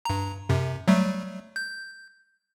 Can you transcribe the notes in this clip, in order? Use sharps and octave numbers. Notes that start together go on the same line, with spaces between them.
G2 A#5
F#2 C3
F#3 G3 A3
G6